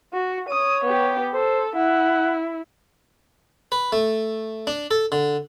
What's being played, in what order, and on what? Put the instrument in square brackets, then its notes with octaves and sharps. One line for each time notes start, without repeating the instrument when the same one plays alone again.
[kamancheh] F#4
[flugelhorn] C#5 [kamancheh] D#6
[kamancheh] B3 G4
[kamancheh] A4 [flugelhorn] C5
[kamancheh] E4 [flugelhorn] F#5
[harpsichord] B4
A3
D4
A4
D3